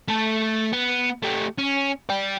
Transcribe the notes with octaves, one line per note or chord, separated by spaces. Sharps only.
A3 A4
B3
A3 G4
C#4
D5 G5